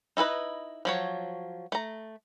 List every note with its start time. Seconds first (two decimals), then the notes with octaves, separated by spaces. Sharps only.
0.17 D#4 E4 A4 B4 D#5
0.85 F3 F#3 C#5
1.72 A3 A#5